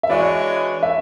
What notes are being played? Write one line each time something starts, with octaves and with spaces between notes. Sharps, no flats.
E5
E3 G#3 D4 F#4 C#5 D5
E5